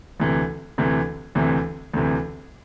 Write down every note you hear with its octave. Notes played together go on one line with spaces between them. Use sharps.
D2 C3 E3
D2 C3 E3
D2 C3 E3
D2 C3 E3